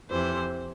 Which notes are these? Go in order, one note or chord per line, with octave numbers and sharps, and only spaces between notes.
F2 C3 E3 C5